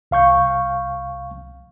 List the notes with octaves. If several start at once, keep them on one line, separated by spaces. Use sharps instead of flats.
C2 F5 C#6 G6